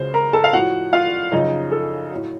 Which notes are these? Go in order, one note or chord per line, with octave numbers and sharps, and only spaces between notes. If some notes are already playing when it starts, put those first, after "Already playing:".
Already playing: C#2 C#3 F#3 C5
A#4 A#5
A4 A5
F5
A2 F3 F#4 F#5
F4 F5
F#2 C#3 F3 D#4 D#5
A4
A2 F#3